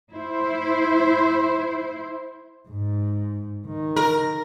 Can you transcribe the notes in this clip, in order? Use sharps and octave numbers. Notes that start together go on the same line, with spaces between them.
E4 C5
G#2
D#3
A#4